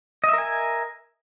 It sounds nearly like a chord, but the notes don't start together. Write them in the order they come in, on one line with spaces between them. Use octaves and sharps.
D#5 E5 A#4 G#5